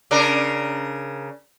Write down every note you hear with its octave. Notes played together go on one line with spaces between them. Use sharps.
C#3 D4 A#4